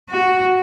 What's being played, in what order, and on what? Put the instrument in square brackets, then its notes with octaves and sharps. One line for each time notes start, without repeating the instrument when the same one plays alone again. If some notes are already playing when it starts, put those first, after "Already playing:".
[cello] F#4